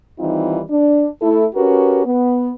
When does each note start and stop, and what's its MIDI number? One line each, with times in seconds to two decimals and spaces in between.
0.20 0.62 51
0.20 0.62 52
0.20 0.62 55
0.20 0.62 60
0.20 0.62 63
0.20 0.62 65
0.71 1.08 62
1.22 1.45 57
1.22 1.45 64
1.22 1.45 69
1.55 2.05 61
1.55 2.05 66
1.55 2.05 67
1.55 2.05 70
1.55 2.05 71
2.06 2.52 59